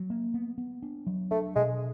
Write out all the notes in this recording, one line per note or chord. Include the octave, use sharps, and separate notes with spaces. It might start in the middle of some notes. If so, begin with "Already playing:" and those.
Already playing: F#3
A#3
B3
B3
D4
F#3
A3 D4
B2 G#3